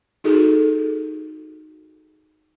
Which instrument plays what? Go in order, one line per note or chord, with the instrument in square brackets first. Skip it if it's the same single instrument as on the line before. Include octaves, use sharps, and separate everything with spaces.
[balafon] D#4 F#4 G#4 A4